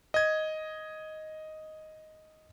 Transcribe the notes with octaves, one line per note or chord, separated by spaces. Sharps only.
D#5 G#6